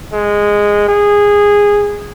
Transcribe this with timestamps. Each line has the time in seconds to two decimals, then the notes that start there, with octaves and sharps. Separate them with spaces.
0.12 G#3
0.88 G#4